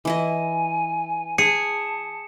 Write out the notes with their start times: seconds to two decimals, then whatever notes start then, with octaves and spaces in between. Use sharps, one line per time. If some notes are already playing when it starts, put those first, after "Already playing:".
0.05 E3 E4 D#5 G#5
1.38 G#4 A5 C#7